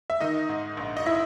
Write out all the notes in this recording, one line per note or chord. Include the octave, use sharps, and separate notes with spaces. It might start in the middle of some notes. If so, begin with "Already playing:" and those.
E5
D#3 D#4 D#5
G#2
A#1
D#5
E4 E5